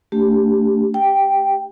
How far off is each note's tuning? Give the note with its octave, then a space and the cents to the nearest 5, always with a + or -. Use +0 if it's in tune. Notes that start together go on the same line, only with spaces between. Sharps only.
A3 +15 D4 -30 G4 +0
G4 +0 G5 +0